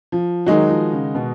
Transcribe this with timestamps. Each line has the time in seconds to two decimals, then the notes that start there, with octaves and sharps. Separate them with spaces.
0.12 F3
0.46 D#3 F#3 G#3 D#4 F#4
0.69 F3
0.92 C#3
1.15 B2